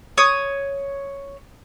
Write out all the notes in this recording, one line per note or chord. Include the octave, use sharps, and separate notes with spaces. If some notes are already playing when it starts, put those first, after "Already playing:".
C#5 D#6